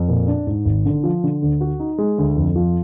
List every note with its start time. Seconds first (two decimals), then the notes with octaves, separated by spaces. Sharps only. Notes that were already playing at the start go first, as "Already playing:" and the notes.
Already playing: F2
0.08 A#2
0.28 D4
0.47 G#2
0.65 G#1
0.86 D3
1.04 F3
1.24 D3
1.42 D2
1.61 F#4
1.80 D#4
1.98 G#3
2.18 D2
2.36 F2
2.56 F3